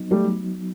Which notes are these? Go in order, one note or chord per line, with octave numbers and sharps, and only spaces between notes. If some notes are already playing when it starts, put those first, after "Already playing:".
Already playing: F#3 B3 D#4
F#3 G3 A3